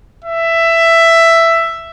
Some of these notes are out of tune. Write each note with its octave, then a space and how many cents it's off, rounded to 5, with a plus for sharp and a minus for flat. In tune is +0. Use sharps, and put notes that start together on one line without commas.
E5 +10